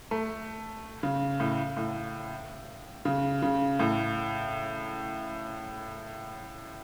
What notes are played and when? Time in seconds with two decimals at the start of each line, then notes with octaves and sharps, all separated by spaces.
0.11 A3
1.03 C#3
1.40 A2
1.77 A2
3.05 C#3
3.42 C#3
3.79 A2